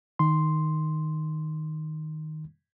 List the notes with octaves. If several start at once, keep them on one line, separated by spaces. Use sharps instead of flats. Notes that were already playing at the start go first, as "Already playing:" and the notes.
D#3 C6